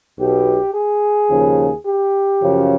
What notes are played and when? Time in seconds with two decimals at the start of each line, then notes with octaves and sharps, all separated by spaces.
0.19 B1 B2 G4
0.74 G#4
1.29 D#2 C#3 F3
1.85 G4
2.41 F#2 C#3 F3